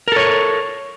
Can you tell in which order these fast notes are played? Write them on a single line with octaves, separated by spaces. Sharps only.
A#4 A4 C#5